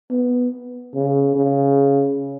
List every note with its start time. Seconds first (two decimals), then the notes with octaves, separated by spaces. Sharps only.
0.11 B3
0.95 C#3
1.36 C#3